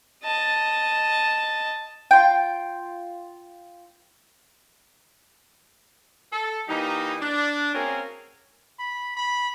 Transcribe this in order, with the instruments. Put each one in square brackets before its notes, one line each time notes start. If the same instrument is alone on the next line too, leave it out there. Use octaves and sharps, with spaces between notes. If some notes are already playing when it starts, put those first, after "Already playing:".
[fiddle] D#5 A5
[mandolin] F4 G5
[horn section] A4
E3 G3 A#3 D#4
D4
A#3 C4 C#4 F#4 G#4 A#4
[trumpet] B5
B5